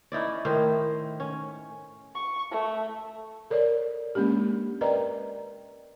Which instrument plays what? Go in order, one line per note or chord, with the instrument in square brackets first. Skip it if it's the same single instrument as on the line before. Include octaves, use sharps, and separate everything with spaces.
[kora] C#4 D#4 E4 D5
A2 D#3 E4 C5
C#4
[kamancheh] C#6
A3
[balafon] A4 A#4 C#5 D5
G#3 A#3 C#4 D4 G4
A#4 B4 D5 D#5 G5 A#5